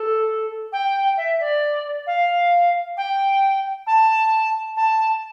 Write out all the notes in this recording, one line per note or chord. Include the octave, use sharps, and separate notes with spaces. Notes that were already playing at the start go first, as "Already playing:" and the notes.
Already playing: A4
G5
E5
D5
F5
G5
A5
A5